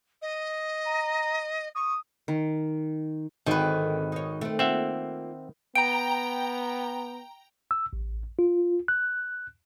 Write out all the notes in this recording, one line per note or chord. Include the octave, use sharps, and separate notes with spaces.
D#5
A#5
C#6 D#6
D#3
G#1 D3 D#3 C4 B4
D#4 C#5
A3 C4
A#3 C4 F4 E5 F#5
B3 G5 A#5 D7
E6
A1
F4
F#6